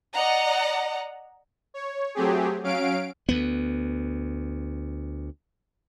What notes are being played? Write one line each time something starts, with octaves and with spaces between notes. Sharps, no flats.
D5 D#5 F#5 A#5
C#5
F#3 A3 C4 G4 G#4
F#3 C#4 F5 D7
D2 B3